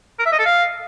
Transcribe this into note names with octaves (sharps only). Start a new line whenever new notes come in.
A#4
E5
D#5
A4
F5